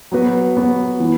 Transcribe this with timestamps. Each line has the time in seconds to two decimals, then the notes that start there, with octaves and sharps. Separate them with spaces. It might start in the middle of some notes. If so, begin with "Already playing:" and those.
0.12 F#3 B3 F#4 B4
0.56 F#3 B3 F#4 B4
1.00 E3 B3